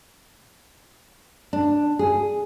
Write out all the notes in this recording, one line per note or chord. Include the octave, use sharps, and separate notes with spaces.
D4
G#4